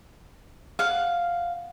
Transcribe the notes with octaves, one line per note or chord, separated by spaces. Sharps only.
F5 F#5